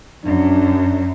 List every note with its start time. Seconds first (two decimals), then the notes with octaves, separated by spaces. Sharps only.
0.25 F#2 D4